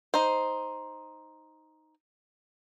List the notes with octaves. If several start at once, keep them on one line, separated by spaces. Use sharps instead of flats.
D#4 C5